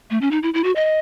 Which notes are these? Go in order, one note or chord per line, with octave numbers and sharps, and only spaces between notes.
A3
C#4
D#4
E4
E4
F#4
D#5